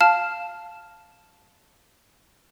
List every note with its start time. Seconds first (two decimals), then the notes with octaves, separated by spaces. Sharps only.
0.01 F5 A5 F6 E7